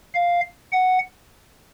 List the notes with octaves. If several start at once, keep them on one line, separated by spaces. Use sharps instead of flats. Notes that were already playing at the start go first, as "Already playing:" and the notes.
F5
F#5